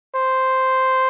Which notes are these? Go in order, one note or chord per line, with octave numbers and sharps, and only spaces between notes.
C5